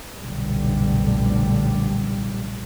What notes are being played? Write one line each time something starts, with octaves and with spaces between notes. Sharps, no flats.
F1 B1 A#2 D3 G3